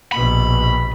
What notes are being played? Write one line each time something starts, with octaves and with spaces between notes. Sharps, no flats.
A#1 B2 B5